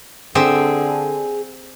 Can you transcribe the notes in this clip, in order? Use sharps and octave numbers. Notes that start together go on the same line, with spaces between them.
D3 C4 G4 G#4 E5